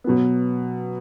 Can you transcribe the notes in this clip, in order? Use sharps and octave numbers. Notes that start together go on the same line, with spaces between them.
B2 F#3 B3